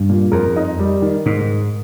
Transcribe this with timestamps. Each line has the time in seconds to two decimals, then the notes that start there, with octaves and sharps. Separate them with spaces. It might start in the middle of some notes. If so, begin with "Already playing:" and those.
Already playing: G2
0.09 A#2
0.32 F2 A#4
0.56 D#4
0.79 G3
1.02 D#3
1.26 G#2 D#3